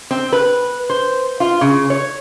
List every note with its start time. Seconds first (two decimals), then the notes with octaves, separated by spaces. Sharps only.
0.11 C4
0.33 B4
0.90 C5
1.40 F4
1.61 C#3
1.90 C#5